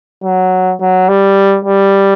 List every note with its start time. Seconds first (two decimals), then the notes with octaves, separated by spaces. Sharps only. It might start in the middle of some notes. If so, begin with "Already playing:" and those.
0.23 F#3
0.80 F#3
1.08 G3
1.65 G3